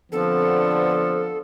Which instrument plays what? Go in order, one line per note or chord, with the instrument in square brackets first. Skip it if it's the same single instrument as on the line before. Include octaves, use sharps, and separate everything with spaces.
[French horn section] D3 B3 C4 [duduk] F3 [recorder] A4